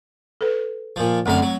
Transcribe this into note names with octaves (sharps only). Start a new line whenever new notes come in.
A4 B4
A#2 F3
F#2 D3 A3 C4 F5 F#5
F#3